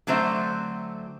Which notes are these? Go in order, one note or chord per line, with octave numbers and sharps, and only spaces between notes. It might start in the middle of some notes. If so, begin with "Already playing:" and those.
D3 F#3 A3 C4 C5 E5